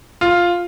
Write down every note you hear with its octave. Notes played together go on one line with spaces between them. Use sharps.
F4